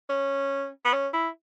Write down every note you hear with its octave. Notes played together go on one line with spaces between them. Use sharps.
C#4
B3
C#4
E4